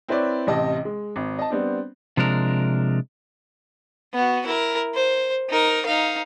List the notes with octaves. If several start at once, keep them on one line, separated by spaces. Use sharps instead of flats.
C4 E4 B4 C#5 D5
A1 C3 D#5 A5
G#3
G#1
D#5 A5
G3 B3 C4 D4
C3 F3 G#3 D4 A#4
B3 F#4
E4 A#4
C5
D#4 A#4
D#4 F5